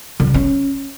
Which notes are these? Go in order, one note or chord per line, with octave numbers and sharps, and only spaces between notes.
D3
C#3
C#4